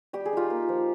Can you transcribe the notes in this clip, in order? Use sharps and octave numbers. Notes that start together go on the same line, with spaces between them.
G3 G4
G#4
D#4 F4 G4
A#3
F3